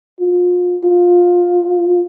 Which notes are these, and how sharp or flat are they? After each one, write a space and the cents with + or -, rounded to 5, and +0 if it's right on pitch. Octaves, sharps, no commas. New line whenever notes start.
F4 +35
F4 +15